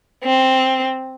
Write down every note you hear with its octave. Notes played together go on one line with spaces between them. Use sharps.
C4